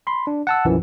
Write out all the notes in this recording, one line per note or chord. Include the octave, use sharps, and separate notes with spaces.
B5 C6
D4
F#5 A5 E6
B1 F#2 E3 F3